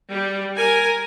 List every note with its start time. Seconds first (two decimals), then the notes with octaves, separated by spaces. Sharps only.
0.11 G3
0.58 A#4 G#5